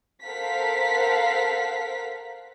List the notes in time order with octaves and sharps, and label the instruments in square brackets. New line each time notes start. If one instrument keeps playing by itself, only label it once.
[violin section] A4 A#4 C5 F5 F#5 B6